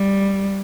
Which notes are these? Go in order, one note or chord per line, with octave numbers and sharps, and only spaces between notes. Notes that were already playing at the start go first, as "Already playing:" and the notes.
Already playing: G3